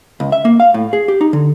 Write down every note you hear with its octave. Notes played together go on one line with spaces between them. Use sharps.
C#2
E5
A#3
F5
A2
G#4
G4
D#4
D3